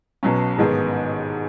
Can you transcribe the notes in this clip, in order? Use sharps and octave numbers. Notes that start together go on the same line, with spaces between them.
B1 B2 F#3 C#4
A1 G#2 D#3 G#3 B3